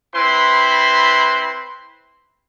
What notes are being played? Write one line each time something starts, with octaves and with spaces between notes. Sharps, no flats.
C4 E4 B4 C6